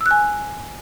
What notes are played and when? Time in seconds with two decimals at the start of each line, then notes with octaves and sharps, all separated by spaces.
0.01 E6
0.06 F#6
0.11 G#5